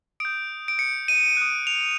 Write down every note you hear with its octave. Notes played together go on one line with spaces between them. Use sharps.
D#6 G6 D7
D7
C#7
D#7
D#6 F#6
F7